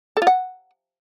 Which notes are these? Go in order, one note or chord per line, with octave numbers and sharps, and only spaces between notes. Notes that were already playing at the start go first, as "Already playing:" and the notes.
A4
F4
F#5